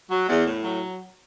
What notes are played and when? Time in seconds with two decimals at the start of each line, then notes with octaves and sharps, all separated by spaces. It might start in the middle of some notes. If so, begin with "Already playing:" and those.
0.10 F#3
0.28 E2
0.47 A2
0.64 F#3